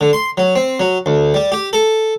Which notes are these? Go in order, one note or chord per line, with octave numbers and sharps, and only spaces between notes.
D3
C6
F#3
C4
F#3
D2
G3
G4
A4